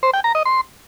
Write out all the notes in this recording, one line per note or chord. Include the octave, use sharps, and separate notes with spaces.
C5
G5
A#5
D#5
C6